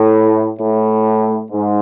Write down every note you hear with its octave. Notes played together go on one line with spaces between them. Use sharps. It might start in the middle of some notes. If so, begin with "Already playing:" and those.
Already playing: A2
A2
G#2